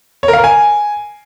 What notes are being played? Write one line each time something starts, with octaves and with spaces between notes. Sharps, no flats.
C#5
A#4
F5
A#4
G#5